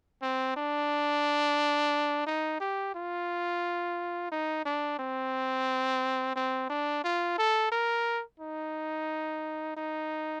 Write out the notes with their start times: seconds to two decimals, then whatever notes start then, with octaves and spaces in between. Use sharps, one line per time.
0.22 C4
0.56 D4
2.26 D#4
2.60 G4
2.95 F4
4.32 D#4
4.65 D4
4.99 C4
6.36 C4
6.70 D4
7.04 F4
7.38 A4
7.72 A#4
8.40 D#4
9.77 D#4